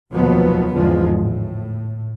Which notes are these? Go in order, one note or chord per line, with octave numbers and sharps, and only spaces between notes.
F1 D#2 B2 F3 F#3 B3
G#1 E2 D3 F3 G#3
A2